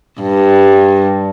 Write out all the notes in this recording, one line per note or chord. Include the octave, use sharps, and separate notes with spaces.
G2